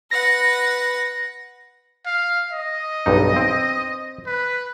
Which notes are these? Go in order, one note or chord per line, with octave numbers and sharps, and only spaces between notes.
B4 F#5 A#6
F5
D#5
B1 G2 D#4
C4
B4